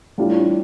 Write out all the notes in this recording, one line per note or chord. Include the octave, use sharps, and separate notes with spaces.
A2 G3 D4 F4